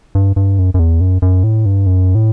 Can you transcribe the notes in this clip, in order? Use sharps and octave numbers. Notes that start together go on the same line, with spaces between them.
G2
G2
F#2
F#2
E2
F#2
F#2
A2
G2
F#2
A2